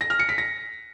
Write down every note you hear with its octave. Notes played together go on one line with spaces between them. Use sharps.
A#6
F6
C#7
B6
A#6